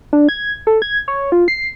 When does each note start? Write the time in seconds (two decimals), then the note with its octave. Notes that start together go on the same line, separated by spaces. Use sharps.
0.13 D4
0.29 G#6
0.67 A4
0.82 G#6
1.08 C#5
1.32 F4
1.48 C7